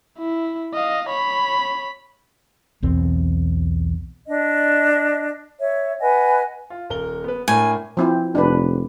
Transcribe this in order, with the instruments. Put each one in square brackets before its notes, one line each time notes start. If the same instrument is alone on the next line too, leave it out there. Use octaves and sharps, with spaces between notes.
[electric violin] E4
D#5 F5
C#5 B5
[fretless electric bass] B1 E2 C4
[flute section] D4 D#5
C#5 E5
B4 D#5 F#5 G#5
[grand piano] F4
D#1 A#4 G7
B3 B4
[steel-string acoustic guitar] A2 [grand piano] D4 A#4 [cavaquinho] G#5
[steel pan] F3 C4 E4
[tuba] F1 [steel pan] D4 B4